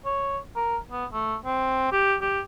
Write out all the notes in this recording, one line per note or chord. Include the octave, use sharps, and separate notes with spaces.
C#5
A#4
B3
A3
C4
G4
G4